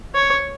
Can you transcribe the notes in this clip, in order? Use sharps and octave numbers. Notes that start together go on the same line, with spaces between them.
C#5